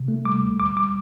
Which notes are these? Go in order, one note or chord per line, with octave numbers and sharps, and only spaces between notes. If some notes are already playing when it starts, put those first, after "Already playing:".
Already playing: C3
A3
G3 D6
D2
D2 D6
G3 D6